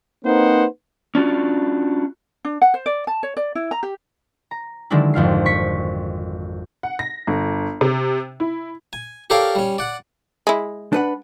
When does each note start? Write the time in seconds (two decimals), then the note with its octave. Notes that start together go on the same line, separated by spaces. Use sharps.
0.25 A#3 C4 D#4 B4 C5 F#5
1.15 C#4 D4 F4 F#4
2.45 D4
2.62 F#5
2.74 C5
2.86 D5
3.07 A5
3.23 C#5
3.37 D5
3.55 E4
3.71 A#5
3.83 G4
4.51 A#5
4.90 D3 D#3 F#3 G#3 D4 E4
5.14 G#1 F2 F5 C7
5.46 C#6 B6
6.83 F#5
6.99 A#6
7.27 G1
7.81 C3
8.40 E4
8.93 G#5
9.30 G4 A4 A#4 C#5 D5 F5
9.55 G3 C#4
9.78 D5 F#5
10.47 G#3 E4
10.93 D4 B4 F#5